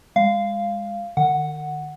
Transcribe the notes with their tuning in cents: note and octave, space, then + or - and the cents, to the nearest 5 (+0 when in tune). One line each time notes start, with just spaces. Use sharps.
G#3 -25 F5 -10
D#3 -40 F#5 +0